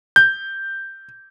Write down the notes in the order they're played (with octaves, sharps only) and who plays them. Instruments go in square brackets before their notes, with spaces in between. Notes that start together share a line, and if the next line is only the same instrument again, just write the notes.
[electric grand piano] G6